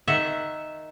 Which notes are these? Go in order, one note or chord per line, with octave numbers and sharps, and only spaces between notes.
D#3 E5 F#5